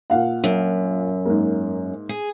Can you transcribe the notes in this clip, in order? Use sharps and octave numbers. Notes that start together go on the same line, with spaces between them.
A#2 F5 F#5
F#2
G#2 A#3
G#4